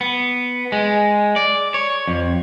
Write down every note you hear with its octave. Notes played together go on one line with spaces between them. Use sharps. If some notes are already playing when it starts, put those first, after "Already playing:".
B3
G#3
D5
C#5
F2